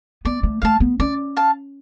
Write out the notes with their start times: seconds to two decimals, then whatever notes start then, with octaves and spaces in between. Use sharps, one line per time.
0.25 B3 D5
0.43 A3
0.62 A3 F5 A5
0.80 B3
0.99 C#4 D5
1.36 F5 A5